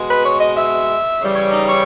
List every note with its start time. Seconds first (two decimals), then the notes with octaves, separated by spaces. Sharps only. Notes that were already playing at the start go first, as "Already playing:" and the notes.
Already playing: B2 G#3
0.09 B4
0.25 C#5
0.40 D#5
0.56 E5
1.20 C#3 E3 G3
1.36 C#5
1.51 D#4
1.67 C#5